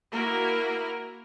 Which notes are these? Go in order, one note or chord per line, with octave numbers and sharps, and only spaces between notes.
A#3 E4 F#4 A#4